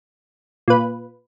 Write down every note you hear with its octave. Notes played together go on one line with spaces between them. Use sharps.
A#2 B4